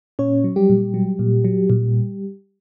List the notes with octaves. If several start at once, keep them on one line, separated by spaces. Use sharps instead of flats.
A#2 C#4 C#5
F#3
G3 G4
A#2
F#3
A#2
F#3
A#2